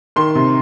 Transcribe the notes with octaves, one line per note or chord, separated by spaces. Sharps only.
D#3 C6
C3